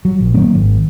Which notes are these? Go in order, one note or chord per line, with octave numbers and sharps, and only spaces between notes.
F#3
A#1
D#3 F#3 A#3 B3
G#1